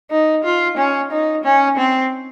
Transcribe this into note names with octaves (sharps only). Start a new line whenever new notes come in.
D#4
F4
C#4
D#4
C#4
C4